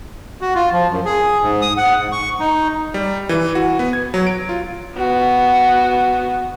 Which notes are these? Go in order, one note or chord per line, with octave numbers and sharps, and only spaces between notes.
F#4
F4
F3
F#2
G#4
G#2
D#6
F#5
G#2
C#6
D#4
G3
E3
F#4
B3
G#6
F#3
D7
F4
B3 F#4